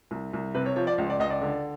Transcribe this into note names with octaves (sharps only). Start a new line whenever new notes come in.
C2
C2
C3 B4
C#5
F3 C#5
D5
C#2
D5
C#2 D#5
D5
D3